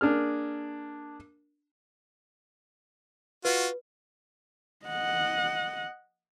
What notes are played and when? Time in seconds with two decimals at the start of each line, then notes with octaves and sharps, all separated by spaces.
0.01 A#3 D4 G#4 F6
3.45 F4 F#4 B4
4.86 D#5 F#5